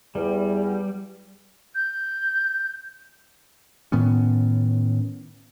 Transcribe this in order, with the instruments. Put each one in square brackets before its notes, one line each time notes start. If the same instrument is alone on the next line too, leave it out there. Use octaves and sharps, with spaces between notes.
[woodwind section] E2 [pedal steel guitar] G3
[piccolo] G6
[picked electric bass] A2 D#3 B3 C#4